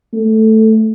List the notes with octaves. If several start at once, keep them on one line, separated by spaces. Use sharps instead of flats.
A3